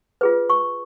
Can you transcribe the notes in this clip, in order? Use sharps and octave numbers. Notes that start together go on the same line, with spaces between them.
F4 G#4 B4
C#6